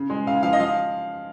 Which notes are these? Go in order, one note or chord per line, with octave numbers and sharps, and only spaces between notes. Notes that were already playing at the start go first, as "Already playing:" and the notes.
Already playing: C#3
G#3
C#3 F5
F3 F5
D#5
F3 F5